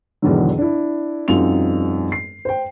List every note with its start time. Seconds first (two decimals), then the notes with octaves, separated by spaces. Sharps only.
0.22 E2 G#2 B2 D3 D#3 F#3
0.58 D4 E4
1.28 E1 F#2 C4 D#4 F4 F7
2.12 C7
2.45 C5 G5